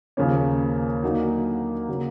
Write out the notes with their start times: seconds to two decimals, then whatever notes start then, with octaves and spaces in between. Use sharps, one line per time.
0.17 D#2 C#3 F3 A#3 C#4
1.03 D3 F#3 A#3 D#4
1.89 C#3 F#3 A#3